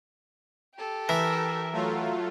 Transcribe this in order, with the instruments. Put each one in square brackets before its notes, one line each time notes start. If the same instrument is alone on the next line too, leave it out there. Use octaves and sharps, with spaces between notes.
[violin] G4 A4
[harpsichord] E3 [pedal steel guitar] A#4 E5
[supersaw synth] F#3 A3 F4